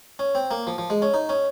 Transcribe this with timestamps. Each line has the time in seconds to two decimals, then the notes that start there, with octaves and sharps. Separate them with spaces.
0.19 C#4
0.35 C4
0.51 A#3
0.67 F3
0.78 F3
0.90 G#3
1.02 C#4
1.14 D#4
1.29 C#4